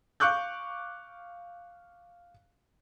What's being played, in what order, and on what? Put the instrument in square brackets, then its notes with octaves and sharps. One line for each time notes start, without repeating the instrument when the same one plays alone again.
[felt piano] F5 C#6 D6 F#6 G6